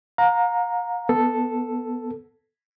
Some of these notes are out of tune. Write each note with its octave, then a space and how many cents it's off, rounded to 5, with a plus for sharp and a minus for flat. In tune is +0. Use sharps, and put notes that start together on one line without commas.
F5 +40 A#5 +0
B3 +0 A4 +0